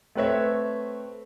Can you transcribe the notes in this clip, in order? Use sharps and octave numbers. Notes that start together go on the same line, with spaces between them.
A3 C4 B4 C#5 E5